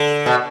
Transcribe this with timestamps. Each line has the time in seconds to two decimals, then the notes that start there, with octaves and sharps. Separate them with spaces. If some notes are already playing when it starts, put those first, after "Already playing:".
Already playing: D3
0.26 B2